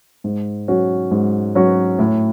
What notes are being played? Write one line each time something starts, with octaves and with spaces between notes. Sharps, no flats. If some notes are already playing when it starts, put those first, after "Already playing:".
G#2
F#3 C#4 F#4
G#2
F#3 C#4 F#4
A2